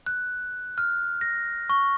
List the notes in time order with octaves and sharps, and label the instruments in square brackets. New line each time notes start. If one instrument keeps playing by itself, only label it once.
[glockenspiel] F#6
F6
A#6
C#6